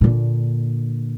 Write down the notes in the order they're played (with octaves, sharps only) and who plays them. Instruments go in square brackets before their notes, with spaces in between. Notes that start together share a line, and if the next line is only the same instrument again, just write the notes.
[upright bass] A#2 D3